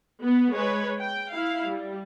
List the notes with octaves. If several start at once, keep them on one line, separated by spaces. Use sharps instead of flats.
B3
G#3 B4 C#5
G5
E4 F5
G3